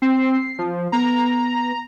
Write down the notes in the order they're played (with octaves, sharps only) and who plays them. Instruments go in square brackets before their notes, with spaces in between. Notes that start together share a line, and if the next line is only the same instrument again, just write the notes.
[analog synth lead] C4 [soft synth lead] C7
[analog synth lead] F3
[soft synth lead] B3 [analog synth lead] A#5